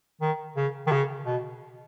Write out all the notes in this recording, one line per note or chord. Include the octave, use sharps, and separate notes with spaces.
D#3
C#3
D#3
C#3
B2